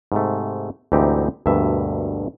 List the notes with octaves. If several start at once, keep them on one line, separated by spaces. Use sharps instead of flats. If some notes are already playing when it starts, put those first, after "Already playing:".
G#2 C3 A3
D2 G#2 E3 C4 D#4 G4
D2 G2 B2 A#3 E5